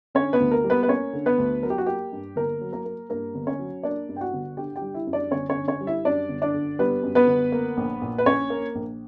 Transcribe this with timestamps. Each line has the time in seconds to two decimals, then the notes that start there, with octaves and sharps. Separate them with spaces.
0.15 D3 C#4 C#5
0.33 B3 B4
0.40 D2
0.51 A#3 A#4
0.64 G3
0.70 B3 B4
0.83 B4
0.88 A#3 C#4 C#5
1.13 D3
1.26 B3 B4
1.38 D2
1.63 F#3 A#4
1.70 G4
1.78 F#4
1.86 A#3 G4
2.12 G2
2.36 G1 A#3 A#4
2.61 F#3
2.73 A#3 A#4
2.86 A#3
3.10 G2 A#3 A#4
3.35 G1
3.47 C#4 C#5
3.59 F#3
3.83 A#3 D4 D5
4.09 G2
4.16 G5
4.21 F#4 F#5
4.34 G1
4.57 D3 G4 G5
4.76 G4 G5
4.82 G3
4.94 E4 E5
5.07 F#2
5.13 D4 D5
5.31 G1 C#4 C#5
5.50 C#4 C#5
5.56 D3
5.68 C#4 C#5
5.81 G3
5.87 E4 E5
6.05 F#2 D4 D5
6.29 G1
6.42 D4 D5
6.54 D3
6.79 G3 B3 B4
7.03 F#2
7.15 B3 B4
7.27 G1
7.52 A#3
7.77 A#1
8.02 A#2
8.18 B4
8.26 A#1 C#4 C#5
8.50 A#3
8.75 A#1